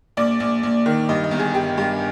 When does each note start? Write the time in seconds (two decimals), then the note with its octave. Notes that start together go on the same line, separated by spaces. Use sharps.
0.17 A#1 D5
0.40 A#1
0.63 A#1
0.86 D#3
1.09 G2 D#5
1.24 D#5
1.31 G1
1.39 G#4
1.54 G1 G4
1.77 G2 G4